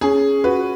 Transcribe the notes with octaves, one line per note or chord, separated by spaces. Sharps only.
C#4 G#4
F#4 B4